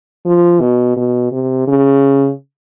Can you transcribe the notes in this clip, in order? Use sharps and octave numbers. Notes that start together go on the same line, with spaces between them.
F3
B2
B2
C3
C#3